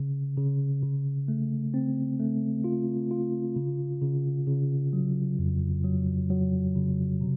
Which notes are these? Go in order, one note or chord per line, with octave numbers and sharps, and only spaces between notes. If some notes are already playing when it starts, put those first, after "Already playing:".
Already playing: C#3
C#3
C#3
A3
C4
A3
F4
F4
C#3
C#3
C#3
F#3
F2
F#3
F#3
C#3
C3